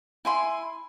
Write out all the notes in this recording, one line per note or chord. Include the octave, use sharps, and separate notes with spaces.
E4 G#5 C6